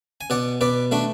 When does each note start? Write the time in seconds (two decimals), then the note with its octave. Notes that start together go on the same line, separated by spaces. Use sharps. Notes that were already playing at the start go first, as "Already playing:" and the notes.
0.21 G#5
0.30 B2 D5 F#5
0.61 B2 B4 D5
0.91 A3 D4 F#4